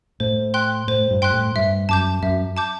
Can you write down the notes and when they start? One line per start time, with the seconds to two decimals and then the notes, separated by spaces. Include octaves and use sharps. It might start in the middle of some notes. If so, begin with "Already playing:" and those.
0.20 A2 C5
0.54 G5 C6 F#6
0.88 A2 C5
1.11 G2
1.22 G5 C6 F#6
1.33 A2
1.55 G2 E5
1.89 F#2 A5 D6 G6
2.22 F#2 E5
2.57 A5 D6 G6